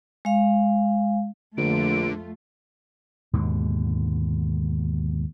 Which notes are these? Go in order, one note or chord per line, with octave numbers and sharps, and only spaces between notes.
G#3 F5
A#1 F2 D3 A3 F4 D7
D#2 G#2 B2 D3